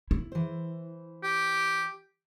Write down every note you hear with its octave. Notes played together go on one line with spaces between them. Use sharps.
E4
E3 C5
G4